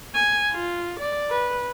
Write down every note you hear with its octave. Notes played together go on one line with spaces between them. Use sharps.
G#5
F4
D5
B4